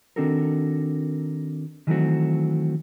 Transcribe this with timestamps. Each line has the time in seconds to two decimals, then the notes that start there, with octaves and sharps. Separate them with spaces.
0.16 D#3 C4 D4 F#4 A4 A#4
1.87 D#3 E3 F#3 A3 C4 F#4